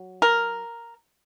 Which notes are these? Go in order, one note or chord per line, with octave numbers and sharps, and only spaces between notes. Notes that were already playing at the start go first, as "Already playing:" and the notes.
Already playing: F#3
A#4